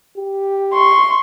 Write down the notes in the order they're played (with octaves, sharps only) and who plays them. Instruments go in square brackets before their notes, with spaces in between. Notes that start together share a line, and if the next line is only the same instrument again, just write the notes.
[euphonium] G4
[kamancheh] C6 C#6